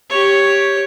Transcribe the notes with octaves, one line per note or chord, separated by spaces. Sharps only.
G4 C#5